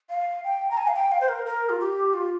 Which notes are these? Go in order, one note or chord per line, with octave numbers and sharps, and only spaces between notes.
F5
G5
A#5
G#5
F5
G5
F5
C5
A#4
A#4
F4
G4
F4